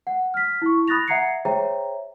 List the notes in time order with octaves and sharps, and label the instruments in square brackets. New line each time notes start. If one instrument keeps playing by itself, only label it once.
[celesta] F#5
F6 B6
E4 C#6
B5 D#6 F#6 A6 A#6 F7
E5 F#5 A#5 G#6 C7 C#7
G#4 C5 C#5 E5 G5 A#5